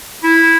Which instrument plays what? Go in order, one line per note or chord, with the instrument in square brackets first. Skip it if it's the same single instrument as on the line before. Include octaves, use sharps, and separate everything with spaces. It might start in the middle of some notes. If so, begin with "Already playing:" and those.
[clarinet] E4